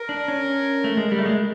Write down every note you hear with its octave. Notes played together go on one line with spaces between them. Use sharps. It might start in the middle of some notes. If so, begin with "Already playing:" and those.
Already playing: A#4
D4
C#4
A3
G#3
G3
A3
G#3